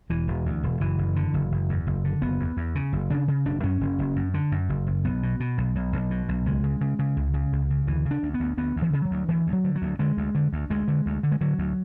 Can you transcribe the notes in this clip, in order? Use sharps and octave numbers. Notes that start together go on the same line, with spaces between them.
E1 E3
E1
D2
E1
F#1 E3
F#1
D3
F#1
F#1
E2
F#1
D3
F#1 B3
E2
E2
C#3
F#1
C#3 D4
C#3
F#1 D4
F#2 C#4
F#1
F#1
F#2
D3
F#2
F#1
F#1
B1 B3
B2
B2
B1
B1
B1
B2
B1
C#2 G#3
C#3
C#3
C#3
C#2
C#3
C#2
C#3
D2 E3
C#3
D4
D2
B3
D2
D2 B3
D2
E3
C#3
F#3
D2
D2 E3
D2
F#3
D3
F#3
D2
D3 G#3
D2
D3
D2
D2 G#3
D3
D2
D3
G#3
D3 F#3
D2